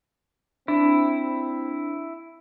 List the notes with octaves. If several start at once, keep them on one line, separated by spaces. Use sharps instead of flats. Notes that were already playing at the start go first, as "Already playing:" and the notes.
C4 D4 E4